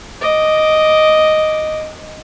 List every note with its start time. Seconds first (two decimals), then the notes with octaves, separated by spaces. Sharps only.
0.21 D#5 D6